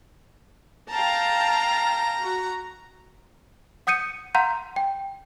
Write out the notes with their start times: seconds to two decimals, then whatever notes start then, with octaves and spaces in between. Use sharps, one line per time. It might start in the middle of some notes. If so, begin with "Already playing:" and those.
0.92 F5 G5 A5 A#5
2.21 F#4
3.87 F#5 D#6 G6 C#7 D#7
4.35 F5 F#5 A#5 C6 G6
4.76 G5